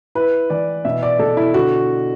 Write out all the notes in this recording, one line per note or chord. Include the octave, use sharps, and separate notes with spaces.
E4 B4
E3 D5
B2 E5
D5
B2 A4
E4
D3 F#4